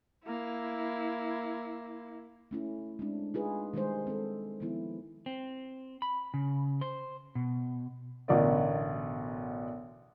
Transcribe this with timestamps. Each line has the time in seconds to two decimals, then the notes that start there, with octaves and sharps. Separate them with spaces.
0.24 A#3 E4
2.51 A3 C#4 E4
2.99 G#3 C4 D4
3.34 D#4 F4 G#4 B4
3.74 D#3 G3 G#3 D#4 G#4 C5
4.07 C4 A4
4.60 D#3 F3 B3 E4
5.26 C4
6.02 B5
6.34 C#3
6.81 C5
7.35 B2
8.28 A1 B2 D3 A#4 D5 D#5